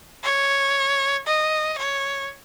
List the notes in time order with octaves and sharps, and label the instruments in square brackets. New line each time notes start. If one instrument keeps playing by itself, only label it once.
[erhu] C#5
D#5
C#5